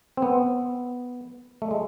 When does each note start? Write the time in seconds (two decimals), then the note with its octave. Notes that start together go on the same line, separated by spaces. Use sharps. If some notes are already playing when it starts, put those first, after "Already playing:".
0.17 C4
0.22 B3
1.62 A3
1.71 G#3